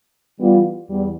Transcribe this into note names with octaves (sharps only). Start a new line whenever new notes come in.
E3 G3 B3 F4
E2 G3